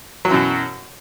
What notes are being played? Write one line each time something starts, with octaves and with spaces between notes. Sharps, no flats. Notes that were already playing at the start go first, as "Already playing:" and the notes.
F#2 B2 E3 F#3